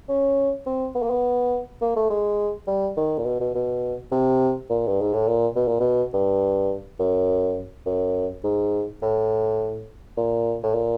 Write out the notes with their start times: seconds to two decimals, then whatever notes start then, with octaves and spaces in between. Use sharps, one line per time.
0.09 C#4
0.66 C4
0.95 B3
1.02 A#3
1.10 B3
1.81 A#3
1.96 A3
2.10 G#3
2.67 G3
2.97 D#3
3.19 A#2
3.26 B2
3.41 B2
3.55 B2
4.12 C3
4.70 A#2
4.88 G2
5.01 G#2
5.13 A2
5.28 A#2
5.56 B2
5.68 A#2
5.80 B2
6.14 G2
7.00 F#2
7.86 F#2
8.44 G#2
9.02 A2
10.17 A#2
10.63 A2
10.74 A#2